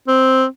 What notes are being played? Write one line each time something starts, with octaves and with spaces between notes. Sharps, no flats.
C4